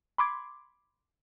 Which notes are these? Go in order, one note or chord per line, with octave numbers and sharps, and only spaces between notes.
B5 C6 D6 G#6